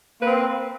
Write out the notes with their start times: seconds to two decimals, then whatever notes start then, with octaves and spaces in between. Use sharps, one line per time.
0.19 A#3
0.22 B4
0.25 C4